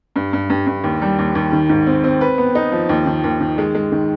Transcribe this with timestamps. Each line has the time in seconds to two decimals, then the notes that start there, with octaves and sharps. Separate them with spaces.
0.16 G2
0.33 G2
0.50 G2
0.67 G2
0.84 D#2
1.01 G3
1.19 D#2
1.35 D#2
1.52 D#3
1.69 G#2
1.87 C4
2.04 C4
2.21 B4
2.38 B3
2.55 D#4
2.72 F3
2.89 D#2
3.06 D#3
3.24 D#2
3.41 D#3
3.58 G#3
3.75 G#3
3.92 D#3